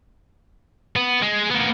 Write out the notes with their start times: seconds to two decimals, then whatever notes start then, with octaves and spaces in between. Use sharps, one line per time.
0.96 B3
1.22 G#3
1.50 A#3 B3